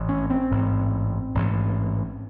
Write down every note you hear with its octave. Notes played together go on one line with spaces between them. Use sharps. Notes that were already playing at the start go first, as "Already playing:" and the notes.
Already playing: A1 G#2
C#4
C4
A1 G#2
A1 G#2